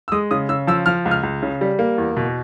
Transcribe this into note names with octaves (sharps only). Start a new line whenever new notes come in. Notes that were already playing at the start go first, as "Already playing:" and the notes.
E6
G#3 D#6
C#3 D#6
C#3 E6
F3 E6
F3 F6
C#2
F6
C#2
C#3
G3
A#3
E2
B2